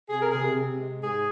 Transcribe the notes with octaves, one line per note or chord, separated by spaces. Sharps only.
C3 G#4
A#4
C3 G#4
C3
G#3
G#2 G#4